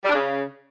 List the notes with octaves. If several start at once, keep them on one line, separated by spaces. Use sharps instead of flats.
G3
D4
C#3